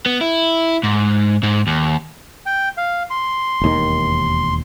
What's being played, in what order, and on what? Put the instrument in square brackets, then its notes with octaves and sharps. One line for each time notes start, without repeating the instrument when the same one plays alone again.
[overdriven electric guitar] B3
E4
G#2
G#2
D#2
[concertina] G5
F5
C6
[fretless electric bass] E1 D#2 D#3